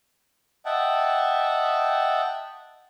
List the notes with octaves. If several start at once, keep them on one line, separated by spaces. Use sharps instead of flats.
D#5 E5 F#5 G5 A5